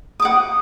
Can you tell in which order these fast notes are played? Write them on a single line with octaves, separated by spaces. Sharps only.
D#6 D6 F#5